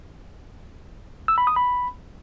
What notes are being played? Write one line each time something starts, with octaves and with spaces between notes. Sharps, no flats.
E6
B5
D#6
B5